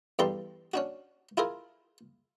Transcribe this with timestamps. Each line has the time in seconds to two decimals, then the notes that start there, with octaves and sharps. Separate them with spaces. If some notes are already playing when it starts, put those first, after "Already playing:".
0.19 E2 G2 G4 A4 A#5 C6
0.74 C#4 D4 F#4
1.37 E4 F4 G#4 A#4